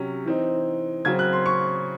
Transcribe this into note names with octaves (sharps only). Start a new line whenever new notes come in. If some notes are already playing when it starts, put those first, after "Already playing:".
Already playing: C3 F#3 C#4
E3 C4 D#4
C#3 F#3 C4 G#6
F#6
C6
C#6